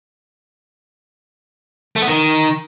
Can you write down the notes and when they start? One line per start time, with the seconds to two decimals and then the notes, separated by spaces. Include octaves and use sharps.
1.96 A3
2.02 B3
2.07 D#3